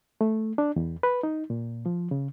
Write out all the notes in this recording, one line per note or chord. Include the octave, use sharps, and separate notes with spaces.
A3
D4
E2
B4
D#4
A#2
F3
C#3